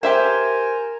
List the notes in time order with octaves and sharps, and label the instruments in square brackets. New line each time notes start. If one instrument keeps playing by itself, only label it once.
[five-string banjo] G4 E5 F#5 [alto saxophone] A#4 [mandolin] C5 [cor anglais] G#5